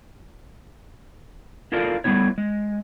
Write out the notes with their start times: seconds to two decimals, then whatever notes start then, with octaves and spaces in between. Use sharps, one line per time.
1.72 E4 F4 A4 A#4 D5 F5
2.04 G3 A3 B3 E4 C#5
2.38 G#3